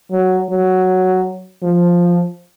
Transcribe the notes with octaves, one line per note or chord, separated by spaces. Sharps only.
F#3
F#3
F3